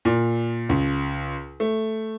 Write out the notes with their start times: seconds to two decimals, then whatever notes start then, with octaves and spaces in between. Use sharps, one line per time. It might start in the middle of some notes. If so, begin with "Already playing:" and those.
0.05 A#2
0.69 C#2
1.60 A3